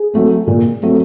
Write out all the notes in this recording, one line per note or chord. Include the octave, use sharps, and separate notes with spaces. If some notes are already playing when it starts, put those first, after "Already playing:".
Already playing: G#4
F#3 A3 C4
A#2
F#3 A3 C4